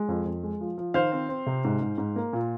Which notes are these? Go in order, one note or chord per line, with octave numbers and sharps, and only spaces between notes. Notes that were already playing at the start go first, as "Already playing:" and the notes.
Already playing: G#3
F2
F2
G#3
F3
F3
D#3 C5 F5
C4
C4
C3
G#2
G#2
G#2
A#3
A#2